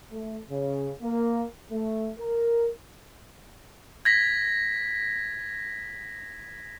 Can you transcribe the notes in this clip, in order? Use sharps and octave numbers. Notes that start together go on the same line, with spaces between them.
A3
C#3
A#3
A3
A#4
G#6 A#6 B6